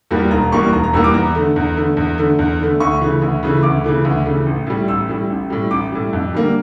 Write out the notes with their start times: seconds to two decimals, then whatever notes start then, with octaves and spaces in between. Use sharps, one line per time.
0.11 E2 E3 G3 A#3
0.31 E1 A#5
0.52 E2 E3 G3 A#3 C#6
0.73 E1 A#5
0.84 A#5
0.93 E2 E3 G3 A#3 E6
1.04 D6
1.14 E2 A#5
1.35 D3 A3
1.56 E2
1.76 D3 A3
1.97 E2
2.18 D3 A3
2.39 E2
2.59 D3 A3
2.80 D2 C#6
3.01 C#3 E3 A3
3.22 D2
3.43 C#3 E3 A3
3.63 D2 D6
3.84 C#3 E3 A3
4.05 D2
4.26 C#3 E3 A3
4.46 A1
4.67 A2 G3
4.88 A1 E6
5.09 A2 G3
5.30 A1
5.50 A2 G3
5.71 A1 D6
5.92 A2 G3
6.13 F2
6.33 D3 G3 A#3